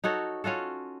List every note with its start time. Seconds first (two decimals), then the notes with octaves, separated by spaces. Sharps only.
0.04 D#4 F#4 A4 C#5
0.44 C#4 F4 F#4 A4